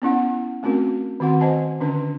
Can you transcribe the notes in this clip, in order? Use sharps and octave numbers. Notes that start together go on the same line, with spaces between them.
B3 C#4 E4 F#5
A3 C4 C#4 F#4 A#4
D#3 C4 F#4 F#5 C6
C5 D#5 G#5 A5
D3 C#4 D4 B4